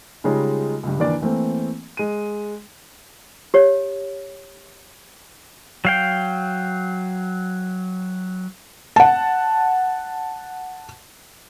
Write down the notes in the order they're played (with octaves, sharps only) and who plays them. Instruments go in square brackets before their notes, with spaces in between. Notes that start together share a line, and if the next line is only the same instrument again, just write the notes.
[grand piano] C#3 G3 G#3 D#4 F4 C#5
C#2 G2
D#2 E3 A#3 D4 D5
E3 A3 A#3 C4
G#3 D#7
[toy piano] G4 C#5
[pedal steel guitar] F#3 F5 G5
[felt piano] F#5 A5